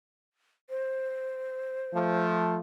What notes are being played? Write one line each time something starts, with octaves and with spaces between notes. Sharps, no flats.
C5
F3 A3